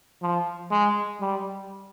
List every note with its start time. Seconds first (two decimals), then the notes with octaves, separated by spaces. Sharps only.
0.22 F3
0.71 G#3
1.21 G3